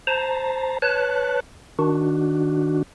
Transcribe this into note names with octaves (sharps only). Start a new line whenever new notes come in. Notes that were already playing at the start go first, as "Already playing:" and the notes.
C5 A5 A#5
B4 C#5 A5 F#6
D#3 D4 F#4